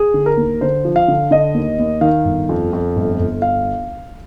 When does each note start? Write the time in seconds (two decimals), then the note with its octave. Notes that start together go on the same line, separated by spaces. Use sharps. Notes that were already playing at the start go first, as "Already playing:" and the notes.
Already playing: G#4
0.14 D3
0.26 A#4
0.37 D#2
0.61 D3 C5
0.85 F3
0.96 F5
1.08 D3
1.31 D3 D#5
1.54 D#2
1.79 D#2
2.01 D#3 F5
2.25 G1
2.49 F2
2.73 F2
2.96 G1
3.19 G1
3.42 F5